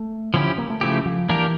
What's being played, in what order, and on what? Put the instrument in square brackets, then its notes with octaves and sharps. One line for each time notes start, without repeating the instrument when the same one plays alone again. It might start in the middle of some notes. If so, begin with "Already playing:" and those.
Already playing: [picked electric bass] A3
[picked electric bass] D3 [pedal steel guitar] F3 C#4 E4 G4
[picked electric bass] A#3
A3
[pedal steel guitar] C#3 F3 A3 E4 G4
[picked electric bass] F3
[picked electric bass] E3 [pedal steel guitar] A#3 D4 G4 A#4